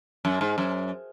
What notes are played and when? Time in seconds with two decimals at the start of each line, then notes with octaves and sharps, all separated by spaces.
0.25 F#2
0.41 G#2
0.58 F#2